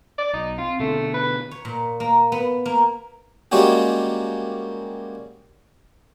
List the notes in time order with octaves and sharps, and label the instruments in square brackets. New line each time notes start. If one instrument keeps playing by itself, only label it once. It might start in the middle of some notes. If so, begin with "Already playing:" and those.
[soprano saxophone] D5
[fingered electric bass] B1 [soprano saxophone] D#4
[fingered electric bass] C4 [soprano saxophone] F4
[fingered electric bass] B2 D3 [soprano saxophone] A3
[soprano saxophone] B4
[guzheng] C#5
A#2
A#3
B3
A#3
[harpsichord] G3 G#3 A#3 C#4 F#4 G4